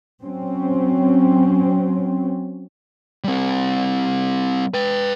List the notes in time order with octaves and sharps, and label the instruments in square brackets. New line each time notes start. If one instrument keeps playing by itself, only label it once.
[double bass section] F#3 C4 C#4
[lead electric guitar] G3 C4
B4 G5